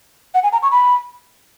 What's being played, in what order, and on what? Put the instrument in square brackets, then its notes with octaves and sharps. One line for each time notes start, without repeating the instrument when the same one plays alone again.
[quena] F#5
G#5
A#5
C#6
B5